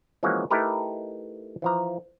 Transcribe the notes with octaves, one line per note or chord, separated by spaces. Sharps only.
E3 F3 G#3 A#3 C#4 F#4
A3 D#4 E4 G4 A#4 B4
E3 F3 A#5